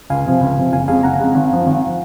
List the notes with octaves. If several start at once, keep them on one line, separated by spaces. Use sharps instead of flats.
C#2 F5 G#5
C3 F3
C#2
C3 F3
F#1 F5 G#5
F2 C#3 G#3 F5 G#5
F#1 F#5 A#5
F2 C#3 G#3
G#1
F#2 F3
G#1
F3